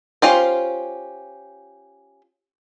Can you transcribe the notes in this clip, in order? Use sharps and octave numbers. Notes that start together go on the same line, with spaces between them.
C#4 F4 G4 C5